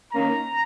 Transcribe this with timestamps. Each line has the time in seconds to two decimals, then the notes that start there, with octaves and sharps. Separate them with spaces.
0.13 D#3 A#3 C#4 A#5